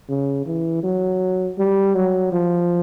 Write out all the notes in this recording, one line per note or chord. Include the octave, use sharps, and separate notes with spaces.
C#3
E3
F#3
G3
F#3
F3